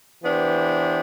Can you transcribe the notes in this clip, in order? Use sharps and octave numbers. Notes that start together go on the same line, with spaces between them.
E3 B3 D4 G4 C5